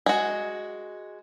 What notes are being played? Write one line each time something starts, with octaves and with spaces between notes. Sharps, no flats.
G#3 F#4